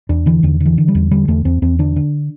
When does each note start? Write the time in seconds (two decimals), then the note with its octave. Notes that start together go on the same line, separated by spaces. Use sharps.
0.09 E2 D4
0.26 D3 E3
0.43 E2 D3
0.60 D3
0.65 E3
0.78 D3
0.88 G3
0.95 E2
1.11 D3 G3
1.28 E2 A3
1.45 E2 C4
1.62 E2 C4
1.79 D3 D4
1.96 D3